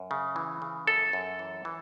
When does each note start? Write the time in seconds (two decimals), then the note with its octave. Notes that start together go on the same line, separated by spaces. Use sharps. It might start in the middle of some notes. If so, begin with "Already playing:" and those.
Already playing: F#2
0.11 C#3
0.36 E3
0.62 C#3
0.87 F#2 A4
1.13 F#2
1.39 E3
1.65 E3